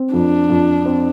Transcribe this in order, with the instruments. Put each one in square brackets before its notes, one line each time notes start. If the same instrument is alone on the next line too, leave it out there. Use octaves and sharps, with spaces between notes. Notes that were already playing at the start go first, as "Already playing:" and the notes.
Already playing: [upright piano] C4
[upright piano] F2 [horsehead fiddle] D4
[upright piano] F2
C4